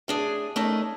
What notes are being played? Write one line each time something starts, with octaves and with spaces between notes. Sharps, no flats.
A2 D4 G#4
A3 C#4 D#4 A#4 D5